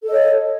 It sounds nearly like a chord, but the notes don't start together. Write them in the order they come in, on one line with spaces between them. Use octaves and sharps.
A4 D#5 C#5